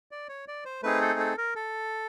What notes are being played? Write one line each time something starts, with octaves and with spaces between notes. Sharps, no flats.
D5
C#5
D5
C5
A3 C4 D#4 G#4 B4
A4
A4
A#4
A4